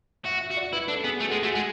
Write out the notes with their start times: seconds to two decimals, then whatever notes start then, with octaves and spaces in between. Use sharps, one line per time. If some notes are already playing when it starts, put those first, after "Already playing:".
0.25 F#4 E5
0.41 E5
0.51 F#4
0.57 D5
0.73 E4 B4
0.88 D4 A4
1.04 B3 G#4
1.20 A3 F#4
1.26 A4
1.31 G#3 G#4
1.43 A3 F#4
1.54 G#3 G#4